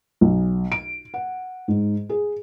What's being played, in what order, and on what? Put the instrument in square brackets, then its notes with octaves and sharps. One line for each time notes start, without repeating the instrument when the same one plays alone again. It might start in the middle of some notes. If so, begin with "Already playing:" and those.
[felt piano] B1
D7
F#5
G#2
G#4